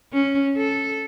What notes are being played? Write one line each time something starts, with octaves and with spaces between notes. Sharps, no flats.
C#4
A4